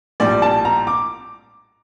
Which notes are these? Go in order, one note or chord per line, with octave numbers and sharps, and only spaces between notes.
A#1 A2 G3 D5
A5
A#5
D6